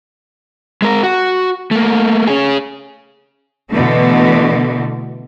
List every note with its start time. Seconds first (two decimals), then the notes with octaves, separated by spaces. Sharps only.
0.82 G#3 A#4
1.03 F#4
1.71 A3 A#3
2.27 C#4 G#4
3.71 B2 D3 E3 A3